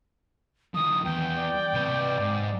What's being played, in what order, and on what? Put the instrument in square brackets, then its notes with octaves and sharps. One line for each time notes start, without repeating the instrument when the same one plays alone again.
[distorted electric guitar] D#3 F3 [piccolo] D#6
[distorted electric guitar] E2 [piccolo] G5
[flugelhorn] D5
[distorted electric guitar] C3 B4
G#2